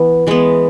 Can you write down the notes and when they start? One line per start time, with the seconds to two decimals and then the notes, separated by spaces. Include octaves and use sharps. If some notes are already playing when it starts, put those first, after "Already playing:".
Already playing: E3 B3
0.27 E3 G#3 B3